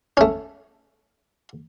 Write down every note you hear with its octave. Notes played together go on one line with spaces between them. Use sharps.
A3 C#4